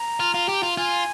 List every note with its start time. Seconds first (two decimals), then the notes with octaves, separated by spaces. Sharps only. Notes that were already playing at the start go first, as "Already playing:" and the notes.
Already playing: A#5
0.20 F4
0.34 F4
0.49 G4
0.63 F4
0.77 F4 G#5